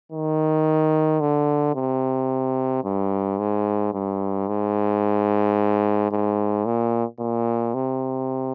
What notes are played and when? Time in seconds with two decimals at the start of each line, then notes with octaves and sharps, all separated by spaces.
0.12 D#3
1.21 D3
1.75 C3
2.84 G2
3.39 G#2
3.93 G2
4.48 G#2
6.11 G#2
6.66 A#2
7.20 A#2
7.74 C3